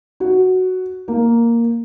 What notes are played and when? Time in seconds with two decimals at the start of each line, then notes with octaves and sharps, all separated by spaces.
0.20 F#4
1.08 A#3